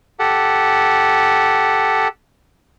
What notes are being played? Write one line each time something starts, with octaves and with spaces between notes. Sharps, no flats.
G4 A4 F#5